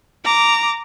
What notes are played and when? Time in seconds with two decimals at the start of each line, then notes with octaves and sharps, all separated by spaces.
0.25 A#5 D6